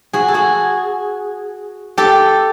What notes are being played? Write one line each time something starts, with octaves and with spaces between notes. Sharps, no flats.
F#4 G#4
A4
F#4 G#4
G4 A4